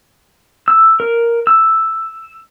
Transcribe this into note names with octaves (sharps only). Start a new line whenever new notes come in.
E6
A#4
E6